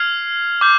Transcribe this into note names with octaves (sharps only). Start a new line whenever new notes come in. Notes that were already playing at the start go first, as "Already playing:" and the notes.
Already playing: F6 G#6 C7 F7
D6 G6